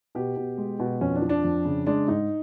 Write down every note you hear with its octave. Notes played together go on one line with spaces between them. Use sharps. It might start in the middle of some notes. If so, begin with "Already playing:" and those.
B2 G4
B2
G#3
B2
F2 C#4
D4
F3
D4
F2
C#3
G#3 D4
G#2 D#4